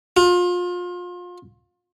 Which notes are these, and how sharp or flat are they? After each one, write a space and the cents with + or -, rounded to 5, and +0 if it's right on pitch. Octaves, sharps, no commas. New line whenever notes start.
F4 +30